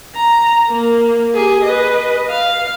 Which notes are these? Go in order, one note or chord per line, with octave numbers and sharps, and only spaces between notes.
A#5
A#3
G4 G#4
B4 D#5
F5